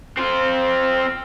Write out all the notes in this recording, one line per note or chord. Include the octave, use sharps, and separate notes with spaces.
C4 F4